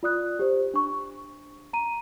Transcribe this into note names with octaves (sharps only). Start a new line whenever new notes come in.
F4 D5 D#6 F#6
G4 C5
D4 C#6
A#5 D#7